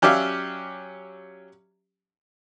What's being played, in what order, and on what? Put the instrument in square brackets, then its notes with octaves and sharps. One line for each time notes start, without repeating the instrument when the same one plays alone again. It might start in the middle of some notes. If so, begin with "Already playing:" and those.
[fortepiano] F#3 C#4 G4 D5 E5 F5